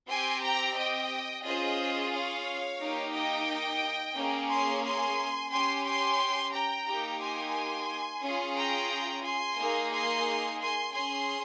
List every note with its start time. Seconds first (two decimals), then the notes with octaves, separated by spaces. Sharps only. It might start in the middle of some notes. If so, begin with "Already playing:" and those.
0.10 C4 G4 G#5 C6
0.43 G5 A#5
0.77 D#5 G5
1.45 C#4 F4 G#4 C5 D#5
2.13 C#5 F5
2.81 A#3 D#4 G4
3.14 D#5 G5
4.16 A#3 C#4 G#4
4.50 G#5 C6
4.84 G#5 C6
5.51 C#4 G4 G#5 C6
5.85 G#5 C6
6.53 G5 A#5
6.87 A#3 D#4 G4
7.21 G#5 C6
8.22 C#4 F4 G#4
8.56 G5 A#5
9.24 G#5 C6
9.57 A#3 D#4 G#4
9.91 G#5 C6
10.59 G#5 C6
10.92 C#4 G#4 G#5 C6